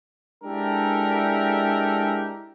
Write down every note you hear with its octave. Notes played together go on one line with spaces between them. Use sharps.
G#3 D4 E4 G4 A4 A#4